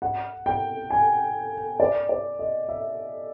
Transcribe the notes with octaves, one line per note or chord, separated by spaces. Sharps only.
F#5
G5
G#5
D5
D5
D#5
E5